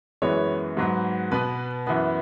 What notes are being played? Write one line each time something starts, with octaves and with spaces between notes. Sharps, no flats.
F#2 E3 G#3 B3 C#5
G#2 F#3 B3
B2 B3 B4
F#2 E3 B3